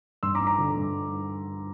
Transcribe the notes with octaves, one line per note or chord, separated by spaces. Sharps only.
G2 C6 E6
A#5 D6
G2
A#5 D6
D3
G2